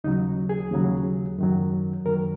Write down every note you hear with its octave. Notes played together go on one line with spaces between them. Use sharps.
D#2 C#3 F#3 D#4
G#4
D#2 C#3 F#3
F#2 D#3 F#3
F#2 D#3 F#3 A#4